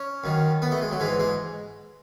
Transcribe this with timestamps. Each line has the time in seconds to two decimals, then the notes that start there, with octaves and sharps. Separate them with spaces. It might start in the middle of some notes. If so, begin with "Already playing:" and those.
Already playing: C#4
0.24 F#2 D#3
0.62 B3
0.71 A3
0.81 G#3
0.91 F#3
1.00 G#2 E3 G#3
1.20 G#3